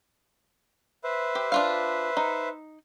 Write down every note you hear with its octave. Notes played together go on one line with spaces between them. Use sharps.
B4 C5 E5
G4
D4 F4 F5
D#4